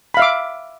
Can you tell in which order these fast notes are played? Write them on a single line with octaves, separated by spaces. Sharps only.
B5 F5 E5 D6